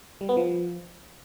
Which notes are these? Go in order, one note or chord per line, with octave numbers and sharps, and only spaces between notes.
G3
B3
F3